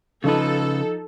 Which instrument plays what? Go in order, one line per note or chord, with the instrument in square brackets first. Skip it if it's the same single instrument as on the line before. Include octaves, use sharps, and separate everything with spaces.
[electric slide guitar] C#3 B4 [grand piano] F3 D#4 [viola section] A4